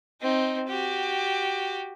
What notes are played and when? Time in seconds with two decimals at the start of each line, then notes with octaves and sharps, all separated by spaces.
0.22 C4 D#4
0.68 F#4 G4